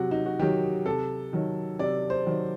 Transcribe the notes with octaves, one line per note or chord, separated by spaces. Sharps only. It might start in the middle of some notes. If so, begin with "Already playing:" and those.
Already playing: C3 F#3 F#4
D#4
F#4
D#3 F#3 G4
C3 A4
D#3 F#3
C3 D5
C5
D#3 F#3